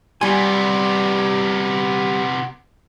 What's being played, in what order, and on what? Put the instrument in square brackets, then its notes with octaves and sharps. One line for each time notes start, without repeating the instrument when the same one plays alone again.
[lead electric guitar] C3 B3 [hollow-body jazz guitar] G3 G#5